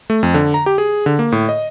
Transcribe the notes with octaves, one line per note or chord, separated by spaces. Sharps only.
A3
F2
D3
A#5
G4
G#4
D3
A#3
A2
D#5